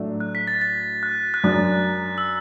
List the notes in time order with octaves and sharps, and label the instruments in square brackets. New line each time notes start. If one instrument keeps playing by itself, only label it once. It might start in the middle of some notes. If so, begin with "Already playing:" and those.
Already playing: [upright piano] A2 F#3 A3 D4
[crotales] F#6
B6
A6
A6
F#6
F#6
[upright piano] F#2 F#3 D4 [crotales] A6
[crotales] E6